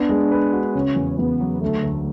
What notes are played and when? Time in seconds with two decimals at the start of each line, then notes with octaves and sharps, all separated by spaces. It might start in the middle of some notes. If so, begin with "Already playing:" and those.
Already playing: B3 D4
0.09 G#3
0.31 B4
0.53 F#4
0.75 C#3 C#4
0.96 E2
1.19 E2 B3
1.40 F#3
1.61 D3 A3
1.83 D2